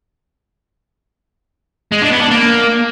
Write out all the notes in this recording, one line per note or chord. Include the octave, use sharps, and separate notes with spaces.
G#3
D4
B3
D4
A#3